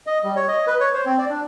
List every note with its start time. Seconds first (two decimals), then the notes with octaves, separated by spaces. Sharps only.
0.07 D#5
0.24 G3
0.36 C#5
0.48 D#5
0.67 B4
0.80 C#5
0.94 C5
1.06 C4
1.18 D5
1.30 D4